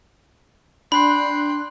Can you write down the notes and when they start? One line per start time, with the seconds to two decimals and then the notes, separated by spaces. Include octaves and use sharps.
0.92 D4 G5 B5 C6 F#6